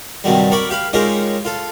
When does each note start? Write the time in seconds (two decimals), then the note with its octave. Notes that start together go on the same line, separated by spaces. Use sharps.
0.24 G2 C3 D#3 F#3 G3
0.52 A#4 D5 B5 C#6
0.70 G4 F5 B5
0.93 G#3 C#4 D#4 F4 G4 A#4
1.45 F4 A4